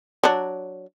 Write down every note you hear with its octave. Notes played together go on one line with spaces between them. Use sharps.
F#3 D4